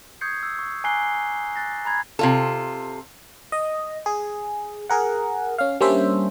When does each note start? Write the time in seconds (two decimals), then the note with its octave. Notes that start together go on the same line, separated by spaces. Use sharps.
0.21 C#6 D#6 G6 G#6 C7 C#7
0.43 E6
0.59 C#6
0.84 G#5 A#5 D6 F#6 C7 G7
1.55 F#6 A6 A#6
1.85 A#5 B5 G#6
2.19 C3 F4 A4
3.52 D#5
4.06 G#4
4.89 G#4 A#4 F#5
5.58 C#4 F5
5.81 G3 A#3 C#4 D4 C5 E5